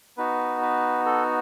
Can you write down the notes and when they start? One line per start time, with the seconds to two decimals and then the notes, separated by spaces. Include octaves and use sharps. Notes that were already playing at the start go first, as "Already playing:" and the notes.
0.17 B3 D#4 F#4 B4
0.61 B4
1.06 A4